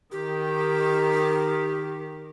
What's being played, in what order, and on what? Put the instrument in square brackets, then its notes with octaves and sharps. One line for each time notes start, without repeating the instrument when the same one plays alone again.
[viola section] D#3 [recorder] G4